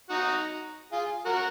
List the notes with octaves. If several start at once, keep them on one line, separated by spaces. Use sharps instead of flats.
D#4 F#4
F4 G#4
F#4 A#4